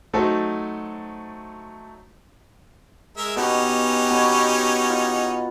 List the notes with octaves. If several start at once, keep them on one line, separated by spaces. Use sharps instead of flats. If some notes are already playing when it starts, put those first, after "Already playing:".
F#3 A3 D#4 A4 C5
G#3 A#4 E5
B2 C#4 D#4 G4
B2 C#5
F4